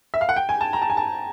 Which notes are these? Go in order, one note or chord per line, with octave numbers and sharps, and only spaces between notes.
E5
F5
F#5
G5
G#5
A5
A#5
A5
G#5
A5